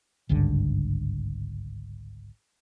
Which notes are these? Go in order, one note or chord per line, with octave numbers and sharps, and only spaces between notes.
G#1 C#2 G2 D3